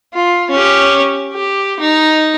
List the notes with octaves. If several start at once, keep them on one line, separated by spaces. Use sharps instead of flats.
F4
C#4 G4
G4
D#4